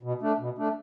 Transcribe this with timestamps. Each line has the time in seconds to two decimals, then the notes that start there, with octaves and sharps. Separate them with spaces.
0.03 B2
0.21 A3 D4
0.39 B2
0.58 A3 D4